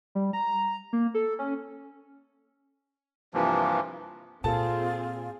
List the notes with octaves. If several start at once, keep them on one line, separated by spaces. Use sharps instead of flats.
G3
A#5
A#3
A4
C#4
G2 C3 E3 F3 A#3
A#2 C4 F4 G#4 A4 A5